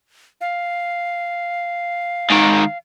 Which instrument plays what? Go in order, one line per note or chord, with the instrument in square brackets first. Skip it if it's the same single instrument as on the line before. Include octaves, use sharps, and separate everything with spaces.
[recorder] F5
[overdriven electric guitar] G#2 D#3